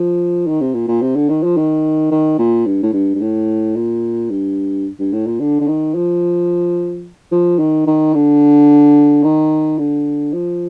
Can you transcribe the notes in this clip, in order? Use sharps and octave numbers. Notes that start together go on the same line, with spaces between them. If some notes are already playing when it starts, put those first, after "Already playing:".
Already playing: F3
D#3
C3
A#2
A#2
C3
D3
D#3
F3
D#3
D#3
A#2
G2
A2
G2
G2
A2
A#2
G2
G2
A2
A#2
D3
D3
D#3
F3
F3
D#3
D#3
D3
D#3
D3
F3